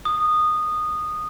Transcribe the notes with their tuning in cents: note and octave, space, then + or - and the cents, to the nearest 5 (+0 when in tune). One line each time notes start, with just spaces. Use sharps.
D#6 -15